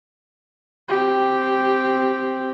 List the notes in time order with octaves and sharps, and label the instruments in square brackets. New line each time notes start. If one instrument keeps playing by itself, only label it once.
[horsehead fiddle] C4 G4